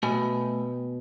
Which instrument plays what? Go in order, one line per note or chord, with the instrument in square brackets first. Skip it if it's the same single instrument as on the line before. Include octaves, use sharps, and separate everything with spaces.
[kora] B2 [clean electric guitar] A3 G5 G#5